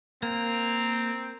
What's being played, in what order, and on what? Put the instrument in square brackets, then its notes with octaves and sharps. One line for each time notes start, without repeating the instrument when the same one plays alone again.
[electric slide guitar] A#3 [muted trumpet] C4 [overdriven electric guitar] A#5